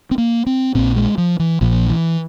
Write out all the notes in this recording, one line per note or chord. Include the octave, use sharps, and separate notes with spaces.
C4
A#3
C4
A#1 A#2 C4
G#3
F3
E3
A#1 A#2 F3
E3